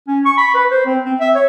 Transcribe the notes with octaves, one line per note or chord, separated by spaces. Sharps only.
C#4
C#6
B5
B4
C5
C4
C4
E5
C#5